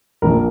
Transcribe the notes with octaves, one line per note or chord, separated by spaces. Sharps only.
A#1 A#2 F3 A#3 A#4